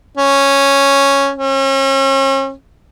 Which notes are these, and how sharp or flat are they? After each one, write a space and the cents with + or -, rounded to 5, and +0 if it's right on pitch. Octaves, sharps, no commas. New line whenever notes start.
C#4 -5
C#4 -40